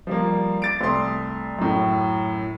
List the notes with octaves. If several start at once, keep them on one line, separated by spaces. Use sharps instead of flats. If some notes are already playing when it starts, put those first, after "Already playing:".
F3 G3 A#3
D6 A6 D7
C2 A3 C6 D#6
F#2 A2